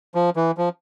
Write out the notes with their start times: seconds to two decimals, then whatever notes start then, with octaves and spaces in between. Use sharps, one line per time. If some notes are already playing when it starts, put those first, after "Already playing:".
0.15 F3
0.36 E3
0.58 F3